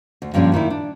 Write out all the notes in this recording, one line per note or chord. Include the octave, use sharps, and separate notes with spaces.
D2
G2 A#2 D3 F3 C#4
A#2 D#3 D#4 E4
D4